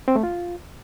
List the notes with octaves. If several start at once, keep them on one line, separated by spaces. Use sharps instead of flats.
C4
A3
F4